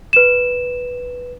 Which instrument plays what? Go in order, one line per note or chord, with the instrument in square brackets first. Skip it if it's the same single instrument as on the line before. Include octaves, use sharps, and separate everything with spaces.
[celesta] B4 E7